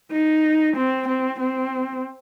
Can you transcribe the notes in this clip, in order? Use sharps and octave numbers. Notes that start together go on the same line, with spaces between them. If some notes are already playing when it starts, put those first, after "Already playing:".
D#4
C4
C4
C4